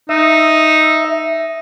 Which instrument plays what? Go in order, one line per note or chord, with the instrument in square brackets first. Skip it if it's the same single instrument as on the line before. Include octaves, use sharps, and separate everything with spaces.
[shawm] D#4 [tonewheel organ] E5